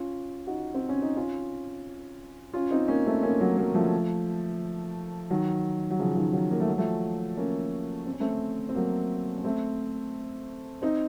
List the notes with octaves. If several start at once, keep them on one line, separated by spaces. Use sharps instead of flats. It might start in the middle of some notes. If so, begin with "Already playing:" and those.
Already playing: C#4 F4
D#4 F#4
C4
C#4
D#4
C#4 F4
C#4 F4
C4 D#4
A#3 C#4
A3 C4
A#3 C#4
F#3 A#3
F#3 A#3
F3 A3
D#3 F#3
F#3
C#3 F3
D#3 F#3
D#3 F#3
A#3
A3
F#3
F3 A3
A#3 C#4
C4
C#4
A3 C4
C4
F#3 A#3
C#4
A3 C4
C4 D#4